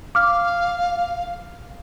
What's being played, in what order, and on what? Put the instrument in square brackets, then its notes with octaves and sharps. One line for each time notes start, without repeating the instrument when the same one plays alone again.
[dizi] F5 [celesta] D6 F6